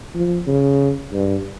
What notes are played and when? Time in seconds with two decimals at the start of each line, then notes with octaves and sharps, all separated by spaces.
0.15 F3
0.47 C#3
1.13 G2